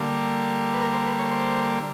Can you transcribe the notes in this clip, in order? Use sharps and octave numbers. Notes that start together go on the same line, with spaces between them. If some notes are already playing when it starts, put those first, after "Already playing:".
Already playing: D3 G3 A#3
B4
A#4
C5
B4
C#5
C5